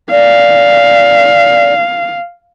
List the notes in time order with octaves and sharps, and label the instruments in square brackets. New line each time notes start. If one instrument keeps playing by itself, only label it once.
[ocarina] D5 [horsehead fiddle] F5